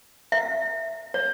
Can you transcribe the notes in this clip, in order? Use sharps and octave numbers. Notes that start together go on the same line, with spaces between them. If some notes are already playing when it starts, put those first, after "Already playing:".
E5
C#5